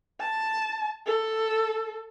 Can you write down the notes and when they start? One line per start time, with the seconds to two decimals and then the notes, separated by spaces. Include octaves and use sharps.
0.21 A5
1.06 A4